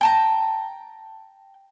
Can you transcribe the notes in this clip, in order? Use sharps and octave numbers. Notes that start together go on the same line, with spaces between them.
G5 A5 A#5